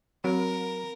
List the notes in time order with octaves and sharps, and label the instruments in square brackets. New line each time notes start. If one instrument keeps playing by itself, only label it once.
[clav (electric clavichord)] F#3 [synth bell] C4 D7 [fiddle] A#4